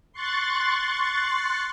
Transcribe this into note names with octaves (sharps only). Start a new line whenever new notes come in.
C6 C#6 F#6 A6